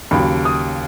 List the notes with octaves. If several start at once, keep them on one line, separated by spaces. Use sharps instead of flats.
D#2 C#3 F#3 B5
D#6